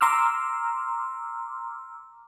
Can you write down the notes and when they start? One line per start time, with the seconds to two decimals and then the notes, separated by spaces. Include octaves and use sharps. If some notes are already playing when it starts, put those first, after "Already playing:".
0.01 A#5 C6 D6 E6 F6